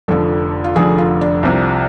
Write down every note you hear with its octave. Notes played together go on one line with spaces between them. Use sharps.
F1 F2 D3 F3 A4
F4
F1 F2 D3 F3 G#4
F4
D4
C2 C3 F3